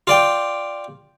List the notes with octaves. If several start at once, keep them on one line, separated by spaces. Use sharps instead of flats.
F4 D5 G5